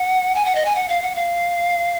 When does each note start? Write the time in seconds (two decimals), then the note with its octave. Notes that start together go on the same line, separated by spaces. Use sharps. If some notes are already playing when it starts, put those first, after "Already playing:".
Already playing: F#5
0.35 G#5
0.45 F#5
0.55 D#5
0.65 G#5
0.75 F#5
0.89 F5
1.02 F#5
1.16 F5